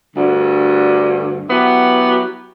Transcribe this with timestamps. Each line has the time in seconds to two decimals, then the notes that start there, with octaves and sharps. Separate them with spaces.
0.16 D2 G2 D3
1.49 F#3 B3 E4 G4